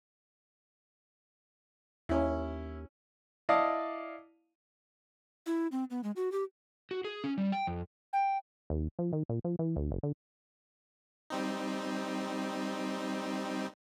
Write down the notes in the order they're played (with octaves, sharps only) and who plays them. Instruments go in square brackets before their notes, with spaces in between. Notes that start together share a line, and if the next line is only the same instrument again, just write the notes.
[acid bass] D#2 [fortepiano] C#4 E4
[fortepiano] E4 D5 D#5 F5 A5 D#6
[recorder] E4
C4
B3
G#3
F#4
G4
[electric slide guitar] F#4
G#4
C#4
G3
G5
F2
[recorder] G5
[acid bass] D#2
F3
D#3
A#2
F3
E3
D2
F#1
D3
[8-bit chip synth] G3 C4 D#4